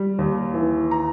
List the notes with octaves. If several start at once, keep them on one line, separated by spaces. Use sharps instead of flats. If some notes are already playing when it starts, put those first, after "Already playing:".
Already playing: G3
D#2
E3
A#5